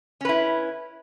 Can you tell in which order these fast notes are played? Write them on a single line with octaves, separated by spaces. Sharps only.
C#4 B4 E4